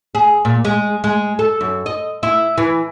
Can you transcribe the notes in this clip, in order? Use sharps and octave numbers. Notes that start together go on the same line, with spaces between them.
G#4
A#2
G#3
G#3
A4
F#2
D#5
E4
E3